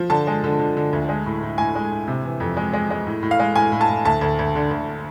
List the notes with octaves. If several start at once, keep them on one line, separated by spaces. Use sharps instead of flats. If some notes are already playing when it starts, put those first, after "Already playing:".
Already playing: F3
D3 A5
G#3
D3
D3
D3
D2
G#3
A2
A2
A2 G#5
G#3
A2
C3
E3
F2
G#3
G#3
G#3
A2
A2
F5
G#3
A2 G#5
A2
A5
A2
D2 A5
D2
D2
D3
D2